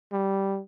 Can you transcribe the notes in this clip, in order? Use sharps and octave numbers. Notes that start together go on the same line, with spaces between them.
G3